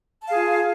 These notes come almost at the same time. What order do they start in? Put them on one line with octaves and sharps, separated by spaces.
A5 F5 G#4 F4